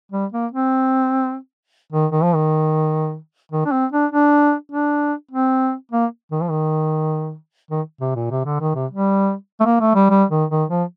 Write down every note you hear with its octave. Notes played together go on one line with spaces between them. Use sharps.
G3
A#3
C4
D#3
D#3
F3
D#3
D#3
D4
C4
D4
D4
D4
C4
A#3
D#3
F3
D#3
D#3
C3
A#2
C3
D3
D#3
C3
G3
A3
A#3
A3
G3
G3
D#3
D#3
F3